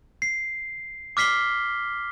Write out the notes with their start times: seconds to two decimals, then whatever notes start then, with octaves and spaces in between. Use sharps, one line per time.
0.22 C7
1.17 D6 F6 B6 C7 G7